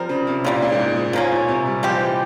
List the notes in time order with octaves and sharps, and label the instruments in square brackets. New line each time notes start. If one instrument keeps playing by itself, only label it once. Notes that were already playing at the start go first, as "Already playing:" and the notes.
Already playing: [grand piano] F3 [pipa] G3 C4 A#4
[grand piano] C#3
C3
[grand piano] A#2 [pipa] C#3 G3 A#3
[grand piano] A#2
G#2
A#2
G#2
[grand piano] A#2 [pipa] F3 A#3 C#4
[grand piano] A#2
C3
G3
[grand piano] F3 [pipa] G#3 C4 G4
[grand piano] E3